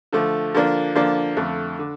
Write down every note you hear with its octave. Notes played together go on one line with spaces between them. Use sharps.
D3 F3 A3
D3 F3 A#3 D4
D3 F3 A#3 D4
F2 D3 A3
D3